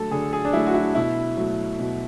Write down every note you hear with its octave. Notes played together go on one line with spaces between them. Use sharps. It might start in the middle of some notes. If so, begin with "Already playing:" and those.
Already playing: D3 F#3 A3 A4
D3 G#4
G#4
D4
F#3 A3 E4
F#4
E4
B2 E4
F#3 A3
B2